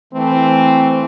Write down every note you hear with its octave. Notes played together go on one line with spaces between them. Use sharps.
E3 A3 C4